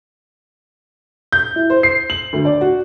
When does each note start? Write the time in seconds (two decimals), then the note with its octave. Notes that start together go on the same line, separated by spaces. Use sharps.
1.32 G6
1.56 E4
1.70 C5
1.83 C7
2.10 F#7
2.33 D2
2.45 D5
2.61 F#4